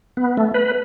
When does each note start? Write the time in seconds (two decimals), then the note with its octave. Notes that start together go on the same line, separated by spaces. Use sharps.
0.17 B3
0.37 A3
0.54 B4